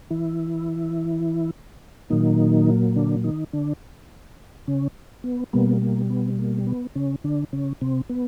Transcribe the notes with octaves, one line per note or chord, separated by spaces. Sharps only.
E3 E4
A#2 D#3 F#3 A#3 D#4
D3 D4
D#3 D#4
D3 D4
C#3 C#4
B3
B2 G3 A#3 B3
A#3
B3
A#3
B3
C#3 C#4
D3 D4
C#3 C#4
C3 C4
B3